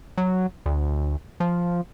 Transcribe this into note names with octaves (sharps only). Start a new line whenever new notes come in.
F#3
D2
F3